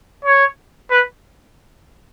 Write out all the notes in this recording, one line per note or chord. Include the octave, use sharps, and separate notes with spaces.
C#5
B4